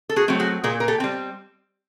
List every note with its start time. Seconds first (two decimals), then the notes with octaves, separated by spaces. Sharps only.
0.09 A4
0.16 F#4 G#4
0.28 F#3 A3 C4
0.39 F#4 G#4
0.64 A#2 G#4 A#4
0.80 A#4
0.88 G4 A4
1.00 G3 C4